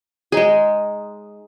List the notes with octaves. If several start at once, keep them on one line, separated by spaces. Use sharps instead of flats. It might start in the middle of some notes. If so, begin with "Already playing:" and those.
G#3 D#4 G#4